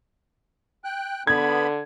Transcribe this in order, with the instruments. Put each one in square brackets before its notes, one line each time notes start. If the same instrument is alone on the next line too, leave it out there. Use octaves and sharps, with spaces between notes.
[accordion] G5 F#6
[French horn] D3 [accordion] B3 B5 [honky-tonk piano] G#6